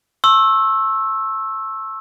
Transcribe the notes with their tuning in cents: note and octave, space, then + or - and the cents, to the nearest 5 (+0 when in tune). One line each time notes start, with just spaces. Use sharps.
A5 +0 C#6 -40 E6 +0